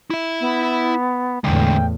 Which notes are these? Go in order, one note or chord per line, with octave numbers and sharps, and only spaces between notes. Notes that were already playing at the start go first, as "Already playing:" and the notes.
E4 E5
B3
E2 A2 D3 G#3 G5